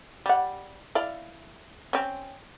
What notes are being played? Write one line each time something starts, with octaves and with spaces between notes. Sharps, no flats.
G3 F#5
E4 D5 F5
C4 C#4